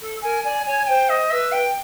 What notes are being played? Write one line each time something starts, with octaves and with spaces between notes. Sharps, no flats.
A4
A#4 G#5
D5 G#5
C#5 G#5
C5 G5
D#5
B4 E5
G5